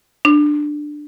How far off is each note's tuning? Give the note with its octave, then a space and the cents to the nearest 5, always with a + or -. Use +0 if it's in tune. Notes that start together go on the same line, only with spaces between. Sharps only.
D4 +15